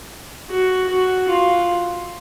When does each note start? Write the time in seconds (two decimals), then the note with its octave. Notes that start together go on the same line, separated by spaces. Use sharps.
0.50 F#4
0.89 F#4
1.29 F4